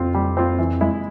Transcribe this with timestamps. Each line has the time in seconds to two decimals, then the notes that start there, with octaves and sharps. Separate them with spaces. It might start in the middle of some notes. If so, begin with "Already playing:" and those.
Already playing: F2 C4 F4
0.14 G3
0.37 C4 F4
0.59 E3
0.81 G#3 E4